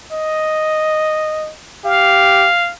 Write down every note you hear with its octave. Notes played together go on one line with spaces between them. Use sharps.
D#5
G4 F5